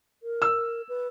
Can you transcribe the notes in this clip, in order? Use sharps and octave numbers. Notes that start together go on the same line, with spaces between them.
A#4
E6
B4